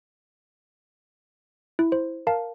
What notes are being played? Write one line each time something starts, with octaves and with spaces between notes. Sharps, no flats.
E4
C5
A#4 F5 A5